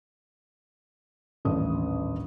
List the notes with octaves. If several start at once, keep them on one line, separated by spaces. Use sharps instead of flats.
D#1 A1 D4 D#6